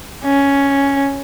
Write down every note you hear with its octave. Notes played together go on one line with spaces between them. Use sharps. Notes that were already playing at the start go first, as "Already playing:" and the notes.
C#4